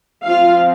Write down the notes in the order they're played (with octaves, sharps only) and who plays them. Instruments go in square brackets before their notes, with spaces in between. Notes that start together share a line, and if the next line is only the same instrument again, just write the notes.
[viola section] F3 C4 F4 F5